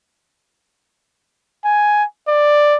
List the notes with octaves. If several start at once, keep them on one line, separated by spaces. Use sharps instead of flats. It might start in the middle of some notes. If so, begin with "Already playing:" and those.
G#5
D5